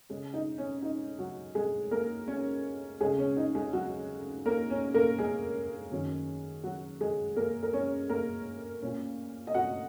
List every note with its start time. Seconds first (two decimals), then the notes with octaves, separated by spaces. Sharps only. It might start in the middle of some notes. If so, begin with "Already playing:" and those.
0.09 C#3 G#3 C#4
0.34 D#4
0.58 C#4
0.82 D#4
1.18 F#3 F#4
1.55 G#3 G#4
1.91 A#3 A#4
2.28 C#4 C#5
3.00 C#3 G#3 C#4 G#4
3.18 C#4
3.37 D#4
3.55 G#3 G#4
3.73 F#3 F#4
4.46 A#3 A#4
4.70 C#4
4.94 A#3 A#4
5.19 G#3 G#4
5.91 F#2 D#3 F#3 C#4
6.64 F#3 F#4
7.01 G#3 G#4
7.36 A#3 A#4
7.63 A#4
7.73 C#4 C#5
8.09 A#3 A#4
8.82 A#2 A#3 C#4
9.47 D#5
9.54 F#4 F#5